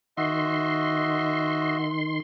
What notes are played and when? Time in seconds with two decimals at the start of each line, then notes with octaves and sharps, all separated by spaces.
0.17 D#3 F#4 D#5 E5 C6